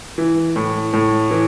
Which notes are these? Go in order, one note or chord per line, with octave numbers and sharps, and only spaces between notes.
E3
A2
A2
E3